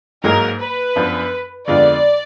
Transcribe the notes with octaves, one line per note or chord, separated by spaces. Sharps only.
G#2 F#3 A#3 D#4 G#4 A#4
B4
F#2 F3 B3 D4
F2 D3 G#3 B3 F4 D5